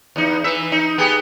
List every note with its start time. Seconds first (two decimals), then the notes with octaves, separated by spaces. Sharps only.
0.16 E2 D#4
0.44 E3 E5
0.72 D#4
0.98 B3 G4 G#4